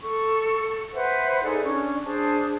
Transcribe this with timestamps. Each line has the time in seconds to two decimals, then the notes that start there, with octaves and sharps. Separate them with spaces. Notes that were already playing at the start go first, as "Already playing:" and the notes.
0.02 A4 C#6
0.94 B4 C5 E5 F#5
1.43 D#4 G#4 A4 D5
1.63 C#4 D4 C#5
2.04 D4 G#4 C5 A5